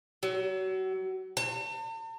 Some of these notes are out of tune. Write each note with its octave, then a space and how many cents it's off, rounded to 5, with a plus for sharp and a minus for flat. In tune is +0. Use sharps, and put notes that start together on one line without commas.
F#3 +30
A5 +45